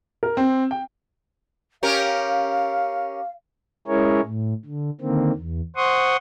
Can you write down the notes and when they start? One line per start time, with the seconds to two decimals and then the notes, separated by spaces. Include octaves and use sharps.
0.23 A#4
0.37 C4
0.71 G5
1.83 C#4 G4 A#4 F5
3.88 G#3 C#4 E4 G#4 A#4 C#5
4.23 A2
4.65 D3
5.01 D3 D#3 A#3 C4
5.35 E2
5.76 C5 F#5 C6 C#6 D#6